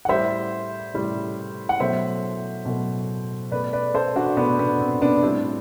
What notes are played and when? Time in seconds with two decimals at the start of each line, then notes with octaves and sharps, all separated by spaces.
0.05 F#5
0.09 A2 G3 C5 E5
0.94 A2 G3
1.69 F#5
1.80 B2 F#3 A3 C5 E5
2.65 B2 F#3 A3
3.51 B2 A3 B4 D5
3.73 B4 D5
3.94 A4 C5
4.16 D4 F#4
4.37 B2 B3 D4
4.40 A3
4.59 B3 D4
4.80 C4
5.01 B3 D4
5.23 A2 G3 C4